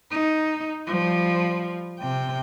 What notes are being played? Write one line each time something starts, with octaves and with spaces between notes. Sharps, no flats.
D#4
F3 G3
C3 G5